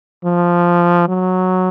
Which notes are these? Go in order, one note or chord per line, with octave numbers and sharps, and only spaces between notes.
F3
F#3